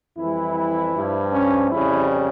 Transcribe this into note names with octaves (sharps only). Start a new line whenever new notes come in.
F2 E3 G3 E4
G2 F3
C#4
F2 C#3 G3 E4